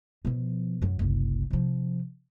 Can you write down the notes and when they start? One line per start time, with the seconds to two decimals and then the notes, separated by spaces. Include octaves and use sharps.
0.25 B2 F3
0.82 F#2 F#3
0.99 F#1 C2
1.51 C3 F3